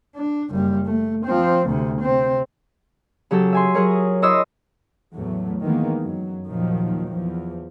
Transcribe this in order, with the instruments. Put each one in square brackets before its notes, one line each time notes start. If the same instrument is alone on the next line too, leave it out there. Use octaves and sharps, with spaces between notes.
[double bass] D4
F#1 G3
A3
F3 C4
D2 C3
C3 C4
[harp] C#3 F#3 G4 A4
E5 G#5 C6
F#3 G#4 A#4 C#5
D#6
E4 C#5 D#5 C6 D#6 E6
[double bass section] E2 A2 F#3 A3
D#3 E3 G#3 A#3 B3
F#2 F#3
D#2 A#2 D#3 F3 F#3
E2 F3